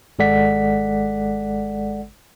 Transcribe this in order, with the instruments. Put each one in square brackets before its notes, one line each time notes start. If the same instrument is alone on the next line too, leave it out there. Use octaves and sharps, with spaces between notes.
[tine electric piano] G#1 G#3 A4 D5 F#5 B6